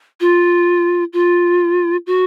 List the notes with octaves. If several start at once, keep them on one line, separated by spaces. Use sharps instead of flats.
F4
F4
F#4